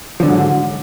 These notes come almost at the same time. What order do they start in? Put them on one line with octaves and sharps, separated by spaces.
F3 D3 F#3 G#2